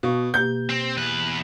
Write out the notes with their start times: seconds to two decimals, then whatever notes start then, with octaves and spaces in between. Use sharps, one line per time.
0.03 B2 F5 C#6
0.34 B2 A#3 G4 G6
0.69 C4
0.97 E2 B4